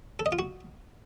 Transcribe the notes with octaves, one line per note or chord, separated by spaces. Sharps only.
A4
D#5
F4
F#4